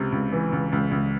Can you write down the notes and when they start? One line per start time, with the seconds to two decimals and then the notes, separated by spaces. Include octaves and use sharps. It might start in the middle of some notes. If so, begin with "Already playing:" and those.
Already playing: C#2 C3
0.12 C#2
0.32 E3
0.52 C#2
0.72 C#2
0.91 C#2